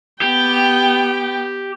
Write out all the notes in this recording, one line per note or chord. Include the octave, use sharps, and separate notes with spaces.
B3 G4 G5